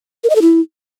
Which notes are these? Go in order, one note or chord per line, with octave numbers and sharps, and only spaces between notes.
A#4
D#5
A4
E4